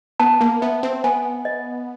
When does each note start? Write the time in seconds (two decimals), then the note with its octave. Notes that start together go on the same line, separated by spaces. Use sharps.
0.20 B3 A5
0.41 A#3
0.61 B3 E5
0.83 C4
1.04 B3 G#5
1.45 D#5